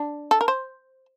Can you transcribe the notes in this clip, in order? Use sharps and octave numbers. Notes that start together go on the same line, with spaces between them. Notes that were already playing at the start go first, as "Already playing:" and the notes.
Already playing: D4
A4
A#4
C5